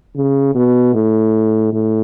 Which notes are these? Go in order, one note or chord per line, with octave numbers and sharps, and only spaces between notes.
C#3
B2
A2
A2